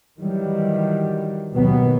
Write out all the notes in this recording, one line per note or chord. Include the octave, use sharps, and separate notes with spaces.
D#3 E3 F#3 G3
D#2 B2 F#3 B3